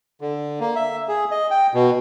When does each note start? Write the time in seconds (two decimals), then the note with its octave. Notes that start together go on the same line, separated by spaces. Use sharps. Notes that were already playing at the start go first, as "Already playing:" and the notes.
0.21 D3
0.60 A#3
0.76 E5
1.08 G#4
1.31 D#5
1.51 G5
1.74 B2